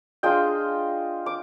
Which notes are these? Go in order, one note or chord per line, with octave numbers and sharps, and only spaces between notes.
G#3 D4 F4 D#5 G5
D6